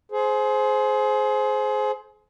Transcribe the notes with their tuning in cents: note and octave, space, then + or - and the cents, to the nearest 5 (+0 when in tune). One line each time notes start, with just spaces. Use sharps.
G#4 +30 C5 +0